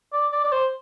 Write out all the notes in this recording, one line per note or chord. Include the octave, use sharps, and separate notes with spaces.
D5
D5
D5
C5